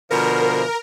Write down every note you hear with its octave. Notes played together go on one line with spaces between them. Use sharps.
B2 D3 F3 A#4